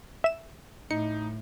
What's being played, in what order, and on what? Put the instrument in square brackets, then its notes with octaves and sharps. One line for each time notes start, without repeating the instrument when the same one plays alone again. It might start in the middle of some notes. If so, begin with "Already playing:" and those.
[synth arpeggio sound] E5 E7
[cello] A2 [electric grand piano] D#4 [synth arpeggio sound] C#7